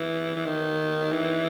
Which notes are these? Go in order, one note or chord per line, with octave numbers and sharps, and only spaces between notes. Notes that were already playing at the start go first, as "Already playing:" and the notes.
Already playing: E3
E3
D#3
E3